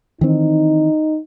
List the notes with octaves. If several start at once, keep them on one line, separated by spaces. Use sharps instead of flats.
D#3 E3 C4 D#4